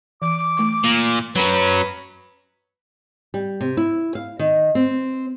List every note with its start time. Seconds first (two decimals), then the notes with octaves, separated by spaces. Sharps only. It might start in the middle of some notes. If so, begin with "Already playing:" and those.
0.22 E3 D6
0.57 A3 C#6
0.84 A#2
1.36 F#3 C#4 B4 A#5 B5
3.34 G3
3.61 C3
3.77 E4
4.15 F5
4.39 D#3
4.75 C4